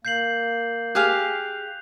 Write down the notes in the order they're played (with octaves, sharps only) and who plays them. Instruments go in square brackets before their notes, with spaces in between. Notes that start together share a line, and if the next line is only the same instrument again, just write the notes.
[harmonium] A#3 [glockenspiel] G6 C7 F#7
[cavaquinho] G4 G#4 F5 [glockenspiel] F#6 F7